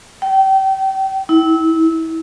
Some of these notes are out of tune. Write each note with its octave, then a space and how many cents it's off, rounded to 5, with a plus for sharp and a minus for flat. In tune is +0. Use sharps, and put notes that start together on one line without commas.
G5 -30
E4 -25